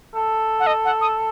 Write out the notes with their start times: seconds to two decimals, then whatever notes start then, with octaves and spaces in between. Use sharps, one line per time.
0.15 A4
0.60 F#5
0.67 D#5
0.85 F#5
1.01 D#6